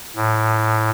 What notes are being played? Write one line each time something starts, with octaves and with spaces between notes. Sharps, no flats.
A2